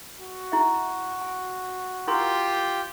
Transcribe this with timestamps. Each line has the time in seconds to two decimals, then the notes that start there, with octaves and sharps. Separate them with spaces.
0.20 F#4
0.52 E4 E5
1.21 G#5
2.07 E4 F4 G4 A#4 C6